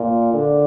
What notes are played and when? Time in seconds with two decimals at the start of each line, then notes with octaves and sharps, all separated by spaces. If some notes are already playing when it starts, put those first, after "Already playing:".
Already playing: A#2
0.34 D3